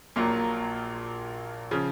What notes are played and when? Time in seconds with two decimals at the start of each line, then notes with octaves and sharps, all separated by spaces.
0.16 A#1 A#2 F#3 A#3 F4
1.71 C#3 F3